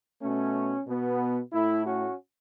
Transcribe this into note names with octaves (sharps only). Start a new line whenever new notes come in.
B2 A3 C#4
B2 B3
A2 A3 E4
C#4 F#4